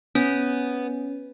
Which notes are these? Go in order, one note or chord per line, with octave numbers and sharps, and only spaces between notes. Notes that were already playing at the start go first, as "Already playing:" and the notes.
B3 C#4